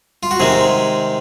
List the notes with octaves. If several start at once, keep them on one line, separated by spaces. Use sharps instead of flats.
F4
F#4
C3 D#3 G#3 G#4